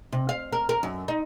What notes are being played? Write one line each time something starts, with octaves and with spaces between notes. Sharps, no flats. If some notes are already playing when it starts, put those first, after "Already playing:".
C3
F5
A#4
A#4
F#2
D#4